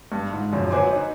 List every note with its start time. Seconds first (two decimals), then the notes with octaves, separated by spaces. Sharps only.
0.12 G2
0.33 G#2
0.52 F#2 A#2 C#3 F3
0.71 F#3 B4 C5 G#5 D6
0.91 D#4